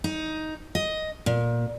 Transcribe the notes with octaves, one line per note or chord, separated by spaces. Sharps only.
D#4
D#5
A#2